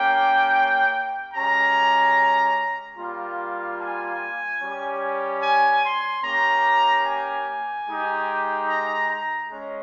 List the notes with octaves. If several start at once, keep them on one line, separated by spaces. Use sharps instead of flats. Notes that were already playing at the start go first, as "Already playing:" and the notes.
Already playing: A#3 C#4 G4 G5
G#3 C#4 G4 A#5
G3 A#3 F4
G#5
G3 C#4 G4
G#5
C6
A#3 C#4 G4 A#5
G#5
G#3 D#4 G4
A#5
A#5
G#3 C#4